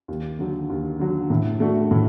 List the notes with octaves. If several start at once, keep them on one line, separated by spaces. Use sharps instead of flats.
D#2
D3 F#3
D#2
D3 F#3
A2
A3 D4 F#4
A2